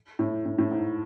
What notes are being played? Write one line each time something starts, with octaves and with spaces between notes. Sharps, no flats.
A2
A2
A2
G#2